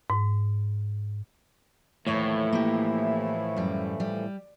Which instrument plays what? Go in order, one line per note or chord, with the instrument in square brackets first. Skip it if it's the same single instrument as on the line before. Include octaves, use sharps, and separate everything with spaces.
[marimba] G#2
[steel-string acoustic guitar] D#2 C#5 A5 [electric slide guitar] A2 [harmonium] E3 F3 A3 [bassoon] E4
[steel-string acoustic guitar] A#3 G4
F#2 G3
G3